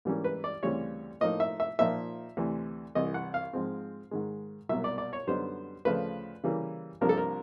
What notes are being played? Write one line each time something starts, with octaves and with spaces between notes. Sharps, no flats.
G#2 E3 G3 A#3 C#4
B4
D5
D2 C#3 E3 G3 C4 C#5
A2 F3 A#3 D#4 D#5
E5
E5
A#2 F3 A#3 D#4 E5
D2 C3 E3
C2 C3 E3 D#5
F#5
F5
G#2 F3 G#3 C4
G#2 D#3 G#3
C2 B2 F#3 A#3 E5
D5
D5
C#5
F#2 D3 G3 B3 D#4 C5
D2 C#3 F3 A3 B4
C#3 E3 G3 A#3
C2 C3 F3 A#3 D4 A#4
A4
A#4